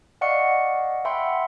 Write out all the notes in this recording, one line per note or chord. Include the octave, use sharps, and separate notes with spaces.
D5 D#5 F5 F#5 C#6 C#7
E5 F#5 G5 B5 C6